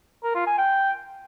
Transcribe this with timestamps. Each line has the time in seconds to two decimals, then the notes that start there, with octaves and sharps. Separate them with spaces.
0.23 A#4
0.35 F4
0.46 G#5
0.58 G5